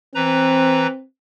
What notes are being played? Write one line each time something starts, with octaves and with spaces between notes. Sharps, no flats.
E3 C4 B4 A#5